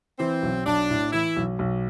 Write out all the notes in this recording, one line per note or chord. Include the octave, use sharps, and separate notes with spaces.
E3 C4
B1
B1 D4
A2
E3 E4
B1
B1